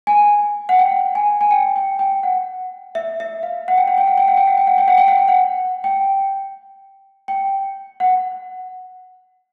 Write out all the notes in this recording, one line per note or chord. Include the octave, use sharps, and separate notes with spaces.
G#5
F#5
G5
G#5
G#5
G5
G5
G5
F#5
E5
E5
F5
F#5
G5
F#5
G5
F#5
G5
F#5
G5
F#5
G5
F#5
G5
F#5
G5
F#5
G5
F#5
G5
G5
F#5